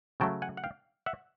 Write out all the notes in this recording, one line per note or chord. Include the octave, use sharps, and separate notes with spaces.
C#3 F#3 A3 G5 A5
F#5 G#5
F#5
F5 G5
E5 F#5